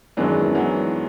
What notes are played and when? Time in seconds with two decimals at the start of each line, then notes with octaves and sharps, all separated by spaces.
0.17 F#2 D#3 E3 F#3 G#3 B3 D4
0.55 E3 F#3